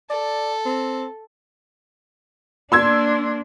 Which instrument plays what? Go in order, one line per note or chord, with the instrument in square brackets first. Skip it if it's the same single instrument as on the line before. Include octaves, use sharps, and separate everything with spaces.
[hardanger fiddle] A4 [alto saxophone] D5
[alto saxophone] C4
[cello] A#3 D4 [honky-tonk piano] C6 E6 G#6